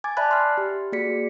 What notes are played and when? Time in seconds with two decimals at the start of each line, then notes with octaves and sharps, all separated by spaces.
0.04 G#5 D6 G#6 A6
0.17 D5 E5 A5 B5 F#6 A6
0.31 C6 F6
0.57 G4
0.92 A#3 F#4 G#4 D5 B6 C#7